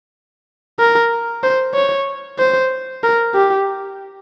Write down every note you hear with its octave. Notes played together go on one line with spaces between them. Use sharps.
A#4
C5
C#5
C5
A#4
G4